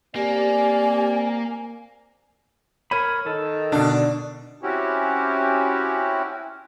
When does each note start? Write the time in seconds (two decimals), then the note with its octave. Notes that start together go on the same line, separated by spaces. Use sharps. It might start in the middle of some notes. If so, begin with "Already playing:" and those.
0.15 A#3 C4 G4 D5 G#5
2.91 A#4 C#5 B5 D#7
3.26 D#3 A4
3.72 B2 D3 D4
4.63 C4 C#4 E4 F#4 G4